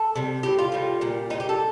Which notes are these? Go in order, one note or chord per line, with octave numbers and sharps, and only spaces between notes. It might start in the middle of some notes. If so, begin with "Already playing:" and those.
Already playing: A4
C3 G3
A2 G3 G4
F4
A2 G3
A#2 G3
A#2 G3 D#4
G4
A4